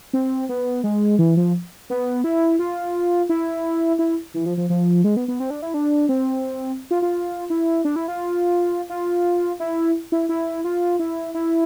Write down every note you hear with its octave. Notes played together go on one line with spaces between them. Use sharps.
C4
B3
G#3
E3
F3
B3
E4
F4
E4
E4
E3
F3
F3
F3
G#3
B3
B3
C4
D4
E4
D4
C4
F4
F4
E4
D4
E4
F4
F4
E4
E4
E4
F4
E4
E4